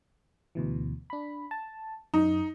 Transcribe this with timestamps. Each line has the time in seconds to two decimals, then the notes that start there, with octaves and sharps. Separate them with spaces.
0.55 D2 B2 E3
1.10 D4 B5
1.51 A5
2.14 F#2 D#4